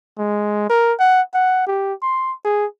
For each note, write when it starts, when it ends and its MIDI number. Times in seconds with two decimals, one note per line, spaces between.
0.18 0.68 56
0.70 0.93 70
0.99 1.21 78
1.34 1.66 78
1.67 1.93 67
2.02 2.32 84
2.45 2.66 68